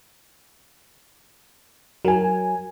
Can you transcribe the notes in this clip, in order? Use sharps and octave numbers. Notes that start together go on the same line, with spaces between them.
F#3 A#4 G#5